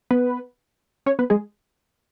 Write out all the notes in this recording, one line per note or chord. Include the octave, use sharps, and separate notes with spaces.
B3 B4
C#4 C#5
B3 B4
G#3 G#4